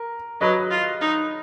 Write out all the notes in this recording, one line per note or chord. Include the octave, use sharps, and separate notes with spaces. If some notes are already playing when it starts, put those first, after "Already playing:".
Already playing: A#4
F#3 B4 D#5
F4
D#4